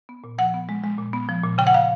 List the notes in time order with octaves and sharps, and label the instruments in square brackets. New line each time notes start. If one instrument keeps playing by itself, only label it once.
[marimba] B3
A#2
F3 F#5
B3
G#3
G#3
A#2
B3
F3
A#2
C#3 G5
F#5
C#3 F5